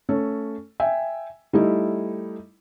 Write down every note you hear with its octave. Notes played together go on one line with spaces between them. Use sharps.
A3 C#4 A4
E5 G5 G#5
G3 A3 D#4 E4